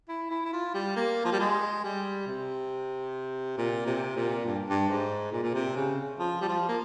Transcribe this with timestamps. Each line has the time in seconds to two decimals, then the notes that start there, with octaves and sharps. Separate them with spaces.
0.09 E4
0.31 E4
0.46 E4
0.53 F4
0.74 G3
0.96 A#3
1.25 F3
1.32 G3
1.40 G#3
1.84 G3
2.27 C3
3.58 A#2
3.87 C3
4.16 A#2
4.45 G2
4.70 G2
4.89 G#2
5.32 A#2
5.43 A#2
5.54 C3
5.76 C#3
6.19 F3
6.41 G3
6.49 F3
6.69 A#3